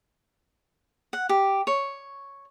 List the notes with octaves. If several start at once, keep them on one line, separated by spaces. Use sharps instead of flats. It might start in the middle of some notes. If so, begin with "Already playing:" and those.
F#5
G4
C#5